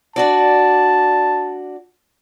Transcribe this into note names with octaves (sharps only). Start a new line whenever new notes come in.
D4 F#4 D5 A5